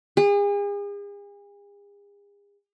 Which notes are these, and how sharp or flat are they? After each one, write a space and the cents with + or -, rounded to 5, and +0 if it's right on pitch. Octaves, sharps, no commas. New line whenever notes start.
G#4 -40